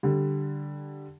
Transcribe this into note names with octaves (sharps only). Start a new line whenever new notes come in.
D3 G3